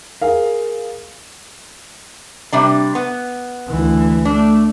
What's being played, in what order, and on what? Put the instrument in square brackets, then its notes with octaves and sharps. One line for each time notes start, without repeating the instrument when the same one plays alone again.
[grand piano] G#4 A#4 F5
[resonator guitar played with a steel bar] C3 G3 D4
B3
[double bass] D2 E3
[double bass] A3 [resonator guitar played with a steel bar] D4